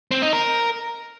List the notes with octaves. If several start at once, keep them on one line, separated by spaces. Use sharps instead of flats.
C4
D#4
A#4